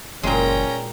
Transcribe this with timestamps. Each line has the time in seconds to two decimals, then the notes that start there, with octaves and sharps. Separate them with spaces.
0.23 F#1 A#2 G#3 C#4 G5 A#5